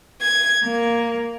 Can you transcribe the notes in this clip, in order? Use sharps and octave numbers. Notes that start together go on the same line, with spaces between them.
G#6
A#3